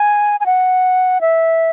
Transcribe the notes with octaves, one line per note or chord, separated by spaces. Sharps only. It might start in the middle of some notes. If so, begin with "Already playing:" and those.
Already playing: G#5
G#5
F#5
E5